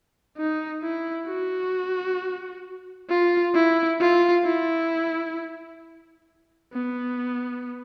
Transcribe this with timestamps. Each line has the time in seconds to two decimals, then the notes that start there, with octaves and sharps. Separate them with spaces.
0.37 D#4
0.83 E4
1.27 F#4
3.09 F4
3.54 E4
4.00 F4
4.45 E4
6.72 B3